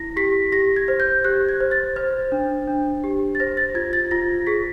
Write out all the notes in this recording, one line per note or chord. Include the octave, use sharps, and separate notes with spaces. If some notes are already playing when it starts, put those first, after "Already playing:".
Already playing: E4 A#6
G4 B6
G4 A#6
G#6
C5
G6
G4 F#6
G#6
C5
A6
C5
D4
D4
G4
A6
C5 A#6
A6
F4 G#6
A6
F4 A#6
G#4 B6